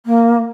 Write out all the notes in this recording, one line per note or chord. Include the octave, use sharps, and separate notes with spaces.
A#3